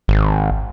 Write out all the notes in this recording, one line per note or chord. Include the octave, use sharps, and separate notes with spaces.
G#1